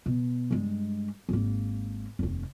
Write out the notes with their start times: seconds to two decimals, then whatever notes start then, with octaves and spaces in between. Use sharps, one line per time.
0.06 B2
0.51 G2 G#3
1.29 G#1 A#3
2.19 F1 D#2